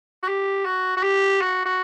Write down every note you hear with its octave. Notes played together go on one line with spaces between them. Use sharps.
F#4
G4
F#4
F#4
G4
F#4
F#4